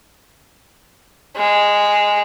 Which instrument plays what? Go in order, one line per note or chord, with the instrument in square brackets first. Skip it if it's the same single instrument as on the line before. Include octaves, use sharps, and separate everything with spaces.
[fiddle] G#3